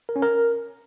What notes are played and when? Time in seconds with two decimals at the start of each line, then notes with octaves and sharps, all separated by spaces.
0.09 A#4
0.16 C#4
0.22 A#4